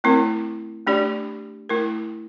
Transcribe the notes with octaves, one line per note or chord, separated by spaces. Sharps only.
A3 C4 E4 A#4
A3 D4 G4 D5
A3 E4 A#4